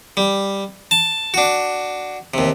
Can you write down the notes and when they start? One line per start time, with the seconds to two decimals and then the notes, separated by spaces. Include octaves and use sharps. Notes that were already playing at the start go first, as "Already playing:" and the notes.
0.17 G3
0.91 A5
1.34 D4 F#4
2.34 D#2 C3